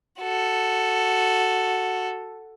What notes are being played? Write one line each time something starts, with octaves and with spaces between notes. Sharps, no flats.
F#4 A4